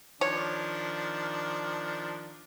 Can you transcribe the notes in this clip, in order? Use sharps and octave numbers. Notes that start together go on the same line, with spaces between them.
D#3 F3 D4 C#5